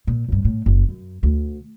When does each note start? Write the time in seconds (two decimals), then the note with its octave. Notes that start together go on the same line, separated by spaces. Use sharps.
0.07 A#2
0.28 C#2 G2
0.45 A2
0.66 F#1
0.89 F#2
1.23 D2